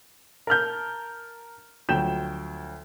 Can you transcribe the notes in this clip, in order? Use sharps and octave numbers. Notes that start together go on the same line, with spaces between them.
A#4 A5 F6 G6
D2 F3 F#3 G5 G6 E7